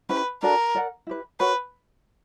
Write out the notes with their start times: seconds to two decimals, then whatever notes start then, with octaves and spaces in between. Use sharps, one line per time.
0.09 C#4 E4 G4 B4 C5
0.43 D4 F#4 A4 A#4 D5
0.75 A#4 D5 F#5
1.07 E4 G4 B4
1.40 F#4 A#4 B4 C#5 F#5